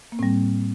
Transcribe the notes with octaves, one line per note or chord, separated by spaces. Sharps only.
A#3
A2 G3 C4